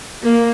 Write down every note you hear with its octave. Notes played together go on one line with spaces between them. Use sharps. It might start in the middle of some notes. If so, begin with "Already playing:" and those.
A#3